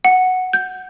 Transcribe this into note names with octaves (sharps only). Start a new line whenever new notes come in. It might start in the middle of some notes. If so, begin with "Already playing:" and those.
F#5
G6